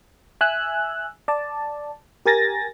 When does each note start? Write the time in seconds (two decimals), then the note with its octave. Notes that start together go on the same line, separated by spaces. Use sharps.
0.41 E5 G#5 E6 F#6
1.28 D5 A5
2.26 G4 A#4 G#5 A6 A#6